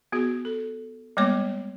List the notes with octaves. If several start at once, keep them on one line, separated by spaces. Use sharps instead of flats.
B3 F#4 G#4
A4
G3 G#3 A#3 B3 C#5 D6